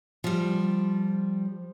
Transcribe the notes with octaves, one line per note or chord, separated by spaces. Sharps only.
F3 G3